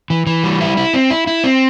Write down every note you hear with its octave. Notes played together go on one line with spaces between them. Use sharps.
E3
E3
G3
E4
E4
C4
E4
E4
C4